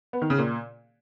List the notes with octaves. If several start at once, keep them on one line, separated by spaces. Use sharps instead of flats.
B3
D#3
C#3
A#2